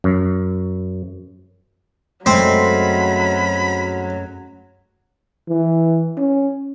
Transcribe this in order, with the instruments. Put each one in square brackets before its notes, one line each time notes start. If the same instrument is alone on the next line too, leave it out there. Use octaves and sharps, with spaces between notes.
[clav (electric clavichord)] F#2
[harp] F#2 G#3 A3 [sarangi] F#3 [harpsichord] C4 [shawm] B5
[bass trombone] E3
C#4